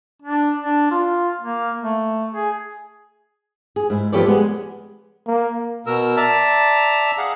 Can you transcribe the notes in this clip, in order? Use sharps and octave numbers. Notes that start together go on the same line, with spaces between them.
D4
D4
F4
A#3
A3
G#4
G#4
G#2 E4
F3 B3 G4 A4 C#5 D5
G#3 B3 G#4
A#3
B2 A#4 E6
D5 E5 A5 A#5
G#4 F5 F#5